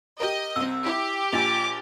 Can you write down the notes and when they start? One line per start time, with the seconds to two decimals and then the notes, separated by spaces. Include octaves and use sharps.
0.20 G4 A#4 D#5
0.56 C2 C4 E6
0.86 E4 G4
1.33 A#1 F4 G#5 D6 A6 F7